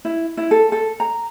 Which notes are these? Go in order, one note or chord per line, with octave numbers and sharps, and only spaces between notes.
E4
E4
A4
A4
A#5